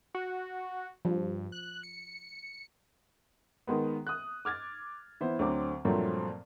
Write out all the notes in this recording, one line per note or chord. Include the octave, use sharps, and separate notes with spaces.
F#4
G2 F3
F#6
C#7
D#3 G#3 B3
D#6 F#6
D6 F6 G#6 A6
E3 B3 E4 C5
D2 D3 F#3 C4 D6
G2 A#2 F3 F#3 A3 C4